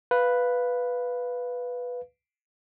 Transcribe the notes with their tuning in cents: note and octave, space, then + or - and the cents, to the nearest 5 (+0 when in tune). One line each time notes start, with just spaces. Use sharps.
B4 +0 F5 +0